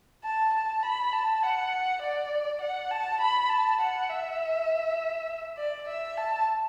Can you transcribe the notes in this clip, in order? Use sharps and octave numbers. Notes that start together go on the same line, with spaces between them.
A5
A5
B5
A5
F#5
D5
F#5
A5
B5
A5
F#5
E5
D5
E5
A5